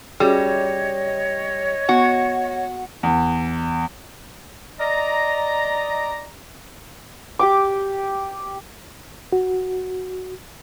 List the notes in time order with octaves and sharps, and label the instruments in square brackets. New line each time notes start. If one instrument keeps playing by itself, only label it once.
[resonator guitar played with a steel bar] G3 [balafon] C#4 F#4 G#4 [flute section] C#5 D#5
[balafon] B3 [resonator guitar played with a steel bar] F#4
[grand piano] E2
[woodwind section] D5 D#5 A#5
[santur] G4 G5 D6
[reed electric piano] F#4